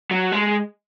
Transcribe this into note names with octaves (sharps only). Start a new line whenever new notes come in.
F#3
G#3